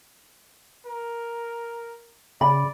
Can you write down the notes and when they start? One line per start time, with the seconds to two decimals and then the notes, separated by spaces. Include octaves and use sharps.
0.86 A#4
2.41 C#3 D5 B5